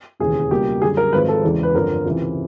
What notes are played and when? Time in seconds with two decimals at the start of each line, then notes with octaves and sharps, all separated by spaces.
0.20 E1 D#2 C#3 E3 G#4
0.51 C#2 B2 G3 A#3 G4
0.81 F#2 D3 G3 G#4
0.97 A#4
1.13 G#1 G#2 F3 G#3 B4
1.29 A4
1.43 E2 C#3 E3 G#3
1.63 B4
1.74 G1 F2 D3 A#4
2.05 C#2 C3 E3